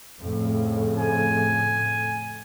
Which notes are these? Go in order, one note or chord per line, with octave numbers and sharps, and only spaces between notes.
F2 A2 C#3
G#5